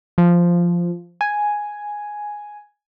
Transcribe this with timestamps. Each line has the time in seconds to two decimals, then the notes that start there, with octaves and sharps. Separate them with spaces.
0.18 F3
1.21 G#5